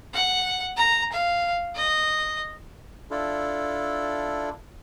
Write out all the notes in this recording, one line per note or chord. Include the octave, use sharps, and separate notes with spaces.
F#5
A#5
F5
D#5
D4 E4 F4 A4